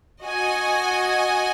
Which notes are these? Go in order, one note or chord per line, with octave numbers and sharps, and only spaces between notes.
F#4 D#5 G#5